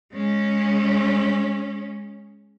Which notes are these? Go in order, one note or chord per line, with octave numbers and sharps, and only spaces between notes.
G#3 C#4